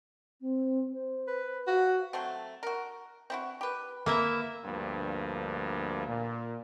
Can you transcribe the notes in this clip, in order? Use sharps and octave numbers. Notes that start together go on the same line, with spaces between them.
C4
C5
B4
F#4 F5
F#3 A3 C4
F#4 A#4
C4 E4 F#4
G4 B4
E3 A#3 E4 E5
D2 G2 F3 A#3
A#2